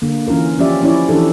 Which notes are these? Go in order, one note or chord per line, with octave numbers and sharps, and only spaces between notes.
D3 A#3
E3 C#4 F4 A#4
F3 C#4 F4 G4 D5 E5
F3 C#4 E4 C#5 D5
E3 F3 D4 G4 A4